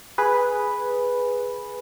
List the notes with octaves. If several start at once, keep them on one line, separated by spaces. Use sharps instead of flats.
G#4 B4